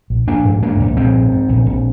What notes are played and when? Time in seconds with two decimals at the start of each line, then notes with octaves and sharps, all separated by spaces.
0.10 A#1
0.27 A#1 A#3 D4
0.45 G#2
0.62 G#2 A#3 D4
0.80 A#1
0.97 A#1 G#3 C4
1.14 G#2
1.32 G#2
1.49 A#1
1.66 A#1